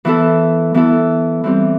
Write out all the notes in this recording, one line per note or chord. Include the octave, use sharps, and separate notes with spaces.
E3 B3 E4 A4
E3 B3 E4 A4
E3 G3 C4 G4